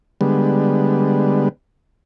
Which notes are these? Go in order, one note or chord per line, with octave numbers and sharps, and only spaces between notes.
D3 G3 G#3 B3